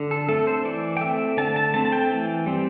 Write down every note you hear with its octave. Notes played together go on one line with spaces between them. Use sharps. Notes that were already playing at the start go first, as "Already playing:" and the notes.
Already playing: D3
A4
A3 C4 A4
C5
E3 D5
G5
A3 C4 E5
D3 A5
A5
A3 C4 A5
A5
G5
E3
G3 C4